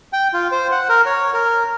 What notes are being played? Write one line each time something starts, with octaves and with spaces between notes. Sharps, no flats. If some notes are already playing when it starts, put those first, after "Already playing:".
G5
F4
C5
F#5
A#4
C#5
A#4